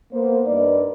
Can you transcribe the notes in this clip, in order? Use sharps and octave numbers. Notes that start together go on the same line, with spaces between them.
A#3 B3 C5
G2 D#4 A#4 B4 D5